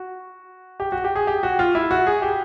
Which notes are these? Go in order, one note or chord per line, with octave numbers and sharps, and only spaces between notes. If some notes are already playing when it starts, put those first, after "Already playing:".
Already playing: F#4
G4
F#4
G4
G#4
G4
F#4
F4
E4
F#4
G#4
G4